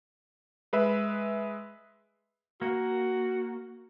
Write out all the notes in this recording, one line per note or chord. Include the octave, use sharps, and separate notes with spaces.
G#3 B4 E5
A#3 F#4